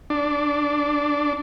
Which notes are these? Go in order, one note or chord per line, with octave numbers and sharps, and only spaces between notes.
D4